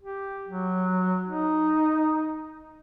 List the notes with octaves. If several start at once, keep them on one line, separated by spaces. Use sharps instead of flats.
G4
F#3
D#4